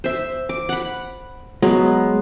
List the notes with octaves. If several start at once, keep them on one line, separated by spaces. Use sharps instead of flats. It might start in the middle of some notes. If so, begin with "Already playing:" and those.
C5 E5
D6
F#5 B5
F#3 G#3 B3